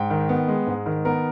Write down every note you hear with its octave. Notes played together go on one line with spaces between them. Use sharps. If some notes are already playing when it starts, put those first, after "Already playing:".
Already playing: G#2 G5
D#3
B3
G#3
G#2
D#3
B3 A#4